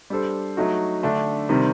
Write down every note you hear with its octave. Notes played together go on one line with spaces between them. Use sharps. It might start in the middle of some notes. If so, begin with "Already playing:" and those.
G3 D4 A4 C5
F#3 A3 D#4 F#4
D3 A3 D4
C3 D#3 G3 C4